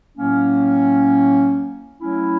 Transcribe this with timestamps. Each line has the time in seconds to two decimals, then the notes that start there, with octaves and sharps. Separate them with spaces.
0.18 A2 F#3 A#3 C#4
2.01 F#3 A3 C#4 E4